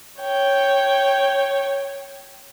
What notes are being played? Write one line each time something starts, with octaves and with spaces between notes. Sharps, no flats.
C#5 G5